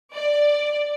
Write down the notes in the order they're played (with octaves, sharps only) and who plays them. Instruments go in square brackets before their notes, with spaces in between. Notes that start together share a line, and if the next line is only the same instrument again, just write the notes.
[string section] D5